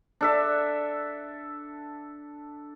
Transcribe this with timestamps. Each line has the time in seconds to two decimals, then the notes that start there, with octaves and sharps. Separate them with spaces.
0.21 D4 A4 E5